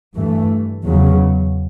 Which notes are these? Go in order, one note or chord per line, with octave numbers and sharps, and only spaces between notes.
G2 E3 A3
E2 C#3 F#3